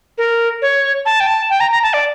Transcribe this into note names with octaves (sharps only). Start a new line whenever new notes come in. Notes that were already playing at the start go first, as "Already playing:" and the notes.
A#4
C#5
A5
G5
A5
G5
A#5
A#5
A5
D5